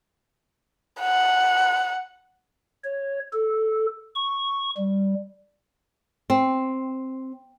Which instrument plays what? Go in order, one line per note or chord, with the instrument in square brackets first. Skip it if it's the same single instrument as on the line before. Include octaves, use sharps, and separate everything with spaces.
[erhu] F#5
[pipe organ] C#5
A4
C#6
G3
[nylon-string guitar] C4